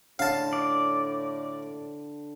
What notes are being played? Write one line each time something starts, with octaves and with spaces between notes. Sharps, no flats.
A2 D3 F5 A5
D5